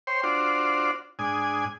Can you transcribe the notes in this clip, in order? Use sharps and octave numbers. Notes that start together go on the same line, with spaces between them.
C5 C#5 G5 C6
D4 F4 F#4 C5 D5
G#2 D4 G#5 D#6